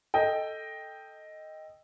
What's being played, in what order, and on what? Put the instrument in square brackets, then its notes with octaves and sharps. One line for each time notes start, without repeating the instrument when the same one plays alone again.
[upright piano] A4 D#5 G5